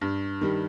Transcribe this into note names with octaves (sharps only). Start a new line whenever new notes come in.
G2
D#3 G3